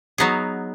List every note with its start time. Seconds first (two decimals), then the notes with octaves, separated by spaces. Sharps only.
0.18 F#3 B3 D#4 G#4